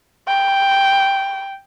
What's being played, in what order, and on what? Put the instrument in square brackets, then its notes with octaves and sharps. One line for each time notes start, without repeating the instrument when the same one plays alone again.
[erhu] G5